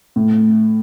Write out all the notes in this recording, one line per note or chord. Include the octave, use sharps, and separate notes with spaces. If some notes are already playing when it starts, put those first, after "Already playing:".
A2